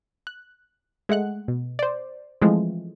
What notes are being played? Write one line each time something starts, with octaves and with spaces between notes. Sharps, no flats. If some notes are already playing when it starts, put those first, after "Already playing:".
F#6
G#3 A3 F#5 F#6
B2
C5 D5
E3 F3 G#3 A3 C4